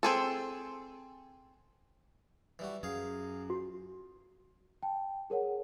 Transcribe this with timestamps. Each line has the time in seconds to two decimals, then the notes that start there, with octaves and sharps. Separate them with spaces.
0.03 C4 G#4 A4
2.59 E3 G3 F#4
2.83 F#2 G#4 F5
3.50 F#4
4.83 G5 A5
5.30 G#4 A#4 C#5 F#5